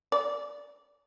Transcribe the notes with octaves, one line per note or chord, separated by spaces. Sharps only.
D5